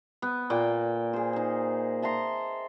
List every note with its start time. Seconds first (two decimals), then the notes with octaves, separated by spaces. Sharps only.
0.22 B3
0.50 A#2 A#3 G5
1.13 G#4 C5
1.33 D#4 C5
2.02 E5 A5 A#5 C6